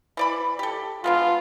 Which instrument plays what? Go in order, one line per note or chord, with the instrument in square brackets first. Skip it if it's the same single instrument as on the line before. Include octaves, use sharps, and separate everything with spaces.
[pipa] E3 D5 B5
G4 A4
[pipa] G#3 B3 D4 [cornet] F4